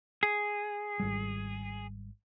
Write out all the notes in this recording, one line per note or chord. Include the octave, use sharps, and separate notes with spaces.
G#4
G#1 G3